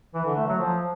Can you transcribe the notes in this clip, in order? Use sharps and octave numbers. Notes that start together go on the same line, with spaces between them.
E3
D3
A3
F#3
F3